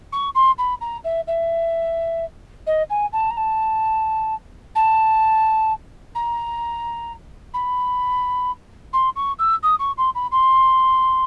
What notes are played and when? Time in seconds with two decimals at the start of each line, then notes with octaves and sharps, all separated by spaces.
0.12 C#6
0.35 C6
0.58 B5
0.81 A#5
1.04 E5
1.27 E5
2.66 D#5
2.90 G#5
3.13 A5
3.30 A#5
3.37 A5
4.75 A5
6.15 A#5
7.54 B5
8.93 C6
9.16 C#6
9.39 E6
9.63 D#6
9.79 C#6
9.98 C6
10.15 B5
10.32 C6